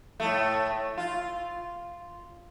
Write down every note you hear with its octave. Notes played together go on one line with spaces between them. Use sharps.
A2 A3
F4